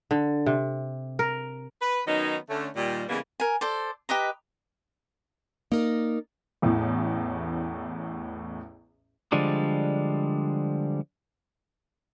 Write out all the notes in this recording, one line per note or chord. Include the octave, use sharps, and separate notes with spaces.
D3
C3
A#4
B4
D#3 F#3 B3 C#4 D#4
D3 A3 C#4
A#2 D#3 G3
C#3 E3 G3 G#3 A#3 B3
A#4 G#5
A4 C5 D5
G4 B4 D#5 A#5
A#3 D#4 A#4 D5
A1 E2 A2
D3 F3 G3 G#3 D4